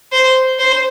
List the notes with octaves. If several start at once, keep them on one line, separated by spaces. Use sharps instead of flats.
C5
C5